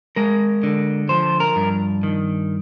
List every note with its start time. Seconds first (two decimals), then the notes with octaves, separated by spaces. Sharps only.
0.16 G#3 A#4
0.63 D3
1.09 F3 C5
1.40 A#4
1.56 G2
2.03 D#3